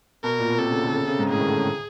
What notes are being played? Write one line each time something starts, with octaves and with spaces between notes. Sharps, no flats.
B2 A#4
A#2
B2
C3 A4
C#3
D3
C#3
C3
C#3
G#2
A2 G#4
D#3
D3
C#3